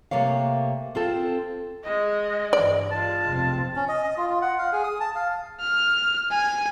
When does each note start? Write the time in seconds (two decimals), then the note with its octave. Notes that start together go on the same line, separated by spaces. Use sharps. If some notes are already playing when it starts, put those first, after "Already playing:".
0.11 C3 A3 A#3 C#5 F5
0.95 C4 F4 A4
1.83 G#3 D#5
2.53 G2 E3 D5
2.92 G#3 F4 A5
3.29 F1 B1 C4
3.76 C#4
3.89 D#5
4.04 D#5
4.17 F4
4.29 F4
4.42 F#5
4.58 F5
4.72 G#4
4.84 D#6
5.00 A5
5.15 F5
5.61 F6
6.31 G#5